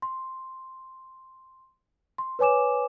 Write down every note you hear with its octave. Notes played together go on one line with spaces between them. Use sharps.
C6
C6
B4 C#5 G#5 D6 E7